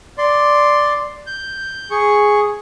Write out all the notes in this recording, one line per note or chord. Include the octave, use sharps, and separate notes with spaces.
D5 C6
G6
G#4 C#6